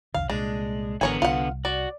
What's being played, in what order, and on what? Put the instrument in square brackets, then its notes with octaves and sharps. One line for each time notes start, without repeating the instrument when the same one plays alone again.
[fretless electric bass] B1 E2 D3 [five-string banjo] F5
[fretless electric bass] C2 A#2 [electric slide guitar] G#3 [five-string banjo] D4
[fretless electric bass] G#1 E3 [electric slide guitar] D3 B3 [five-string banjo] A#4 C#5 G#5
[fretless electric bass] C2 [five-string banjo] F4 F#5
[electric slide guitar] F#4 [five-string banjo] D5